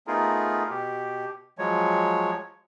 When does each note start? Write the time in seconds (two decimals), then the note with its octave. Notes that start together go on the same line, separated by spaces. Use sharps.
0.07 A3 B3 D#4 F4 G#4 A#4
0.70 B2 G4
1.58 F3 F#3 G#3 C#5